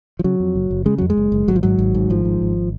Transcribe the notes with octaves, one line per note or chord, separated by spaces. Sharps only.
F3
C#3 F#3
F2
F#1
F#1
C#3 G#3
F2 F#3
G#3
F#1
F#1
G#1 F#3
F3
G#2 F#3
G#1
G#2
G#1 F3
G#2
G#1